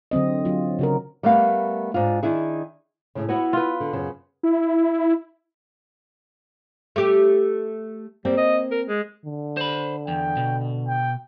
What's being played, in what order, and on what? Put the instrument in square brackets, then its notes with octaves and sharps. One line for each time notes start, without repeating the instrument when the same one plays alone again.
[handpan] D3 F#3 C4 D#5
F#3 F4
C#3 F#4 A#4
[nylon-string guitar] G3 A3 B3 A#4 F5
G#2 D4 F4
D#3 D4 E4 G#4
A2 C#3
[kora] B3 [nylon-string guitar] E4 F#4 C#5
[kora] F4 B4
[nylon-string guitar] D3
F#2 C#3
[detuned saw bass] E4
[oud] A3 G4
[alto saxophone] G3 [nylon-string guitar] A#3 C4
[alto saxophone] D#5
A#4
G#3
[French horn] D3
[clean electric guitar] C5 B5
[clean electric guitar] E2 [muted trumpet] G5
[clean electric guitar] B2
[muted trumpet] G5